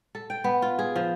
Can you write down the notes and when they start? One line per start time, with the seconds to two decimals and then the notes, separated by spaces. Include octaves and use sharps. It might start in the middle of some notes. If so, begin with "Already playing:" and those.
0.15 A4
0.30 G5
0.44 B3
0.62 F4
0.79 G#4
0.96 F3